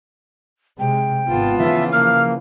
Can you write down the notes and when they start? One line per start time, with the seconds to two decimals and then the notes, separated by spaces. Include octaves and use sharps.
0.79 C3 G#3 G5
1.28 G#1 B3 F4 A5
1.58 C#3 E3 F3 E5
1.92 A#3 F5 F6